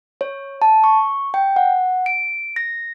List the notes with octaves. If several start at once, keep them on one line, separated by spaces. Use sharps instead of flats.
C#5
A5
C#6
G5
F#5
D7
A#6